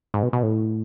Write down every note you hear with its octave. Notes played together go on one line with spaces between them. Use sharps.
G#2
B2
B2
A2